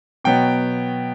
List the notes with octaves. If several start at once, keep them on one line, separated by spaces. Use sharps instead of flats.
B2 F#3 B3 G5